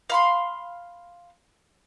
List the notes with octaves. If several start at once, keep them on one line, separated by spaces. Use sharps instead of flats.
F5 B5 C6